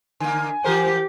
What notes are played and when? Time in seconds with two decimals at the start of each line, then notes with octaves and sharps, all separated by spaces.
0.20 D3 A#3 G#5
0.64 E3 G4 A#4 C5